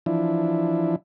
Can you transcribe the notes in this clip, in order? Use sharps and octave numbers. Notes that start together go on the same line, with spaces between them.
E3 F3 D4 E4